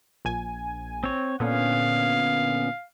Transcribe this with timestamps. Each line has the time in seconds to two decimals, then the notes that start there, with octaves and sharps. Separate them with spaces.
0.25 A#1 G#5
1.04 C4 C#5
1.40 A#2 D3 B3 C#4 F5